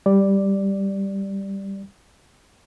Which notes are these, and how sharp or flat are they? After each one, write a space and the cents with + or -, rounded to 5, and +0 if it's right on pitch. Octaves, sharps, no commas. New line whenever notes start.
G3 +0 D5 +0